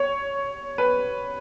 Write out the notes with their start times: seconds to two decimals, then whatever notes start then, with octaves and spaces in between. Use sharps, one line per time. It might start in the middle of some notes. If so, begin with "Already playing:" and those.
Already playing: C#5
0.78 B4